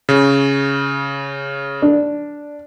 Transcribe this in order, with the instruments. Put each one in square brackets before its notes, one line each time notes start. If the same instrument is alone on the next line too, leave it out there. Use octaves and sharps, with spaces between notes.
[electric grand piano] C#3
[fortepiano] D4